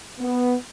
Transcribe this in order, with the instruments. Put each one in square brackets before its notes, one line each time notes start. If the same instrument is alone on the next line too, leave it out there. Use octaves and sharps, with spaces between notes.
[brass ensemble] B3